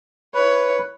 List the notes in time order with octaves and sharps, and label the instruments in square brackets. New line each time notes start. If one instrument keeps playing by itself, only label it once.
[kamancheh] E4 C#5 [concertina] B4